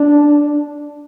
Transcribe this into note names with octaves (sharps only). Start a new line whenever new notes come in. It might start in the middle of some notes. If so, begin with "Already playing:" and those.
Already playing: D4